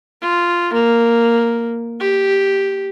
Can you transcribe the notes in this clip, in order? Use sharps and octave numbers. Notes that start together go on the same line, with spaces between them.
F4
A#3
G4